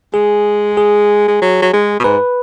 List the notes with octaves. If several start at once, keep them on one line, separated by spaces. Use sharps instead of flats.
G#3 G#4
G#4
G#3
F#3
F#3
G#3
B2
G#2 B4